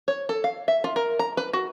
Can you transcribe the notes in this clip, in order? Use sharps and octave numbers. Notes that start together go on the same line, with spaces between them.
C#5
A4
F5
E5
F4
A#4
A#5
B4
F#4